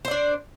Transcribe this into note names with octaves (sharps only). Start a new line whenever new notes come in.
D4 C5 D5